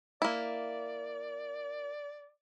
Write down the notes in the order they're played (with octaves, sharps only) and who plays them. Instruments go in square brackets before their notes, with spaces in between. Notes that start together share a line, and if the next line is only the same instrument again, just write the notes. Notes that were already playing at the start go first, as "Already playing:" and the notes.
[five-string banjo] A#3 E4 [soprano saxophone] D5